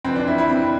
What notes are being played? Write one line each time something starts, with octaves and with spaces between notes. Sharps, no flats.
F2 E3 C4
D4
E4
E4
C4